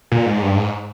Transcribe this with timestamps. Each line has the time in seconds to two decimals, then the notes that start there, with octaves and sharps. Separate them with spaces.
0.12 A#2
0.26 G#2
0.42 G2
0.57 G#2